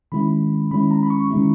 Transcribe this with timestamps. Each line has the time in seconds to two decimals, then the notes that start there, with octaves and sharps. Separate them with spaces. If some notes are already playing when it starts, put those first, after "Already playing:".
0.12 D#3 G#3 C#4 E4 B5
0.71 D#3 G#3 C#4 E4 B5
0.91 A#5
1.03 B5
1.10 C#6
1.30 D#3 G#3 C#4 E4